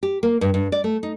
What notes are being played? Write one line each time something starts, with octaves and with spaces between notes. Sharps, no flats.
G4
A#3
G2
G2
D5
A3
D#4